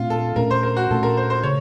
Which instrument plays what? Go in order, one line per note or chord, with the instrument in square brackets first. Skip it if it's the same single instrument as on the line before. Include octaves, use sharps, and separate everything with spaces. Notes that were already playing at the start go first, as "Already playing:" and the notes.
Already playing: [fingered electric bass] A#2 A3 C4 [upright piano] F4
[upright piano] A4
[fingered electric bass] A#2 A3 C#4 [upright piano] A#4
[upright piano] C5
A#4
F#4
[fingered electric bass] A#2 A3 C#4 [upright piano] A4
[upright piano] A#4
C5
C5
[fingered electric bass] C#3 [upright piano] C#5